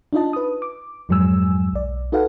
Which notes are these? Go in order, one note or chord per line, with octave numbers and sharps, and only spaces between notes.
D4 D#4 F4 D#5 A5
B4 D#6
D6
F2 G#2 F#3 G#3 G#5 E6
B1 D5
D#4 F#4 A4 B4 F5 F#5